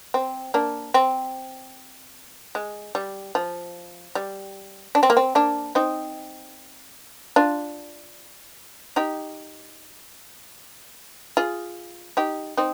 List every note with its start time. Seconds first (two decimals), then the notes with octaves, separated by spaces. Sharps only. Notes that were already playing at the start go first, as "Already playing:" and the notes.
0.14 C4
0.54 A#3 D4
0.94 C4
2.55 G#3
2.95 G3
3.35 F3
4.15 G3
4.95 D4
5.03 C4
5.10 A#3
5.17 C4
5.35 A#3 D4
5.75 C4 D#4
7.36 D4 F4
8.96 D#4 G4
11.37 F4 G#4
12.17 D#4 G4
12.57 C4 D#4